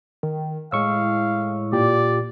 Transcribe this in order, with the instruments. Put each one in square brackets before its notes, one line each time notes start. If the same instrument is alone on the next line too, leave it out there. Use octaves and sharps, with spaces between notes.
[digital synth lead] D#3
[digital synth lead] A2 [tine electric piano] G#3 C#6 E6 [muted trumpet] F5
[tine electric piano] A#2 G4 [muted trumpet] D5